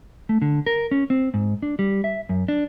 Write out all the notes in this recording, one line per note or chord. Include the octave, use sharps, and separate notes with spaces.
A3
D3
A#4
C#4
C4
G#2
D4
G3
E5
F#2
D4